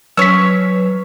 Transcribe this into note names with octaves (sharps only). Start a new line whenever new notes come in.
F#3 C#4 B4 C#5 E6 B6